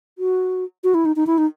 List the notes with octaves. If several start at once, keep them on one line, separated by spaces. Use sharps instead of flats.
F#4
F#4
E4
D#4
D#4
E4
D#4